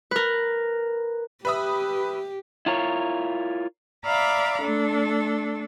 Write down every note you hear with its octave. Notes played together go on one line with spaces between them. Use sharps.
A#4 B4
G4 B4 E5 D#6
E4 F4 A#4 C#5
D5 E5 F5 A#5 B5 D6
A3 D4 A4